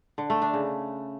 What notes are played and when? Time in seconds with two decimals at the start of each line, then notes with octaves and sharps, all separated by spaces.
0.18 D3
0.30 A3
0.42 D4
0.53 C#3